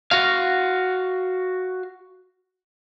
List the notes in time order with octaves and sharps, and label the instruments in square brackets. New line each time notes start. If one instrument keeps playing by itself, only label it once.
[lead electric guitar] F#4 F5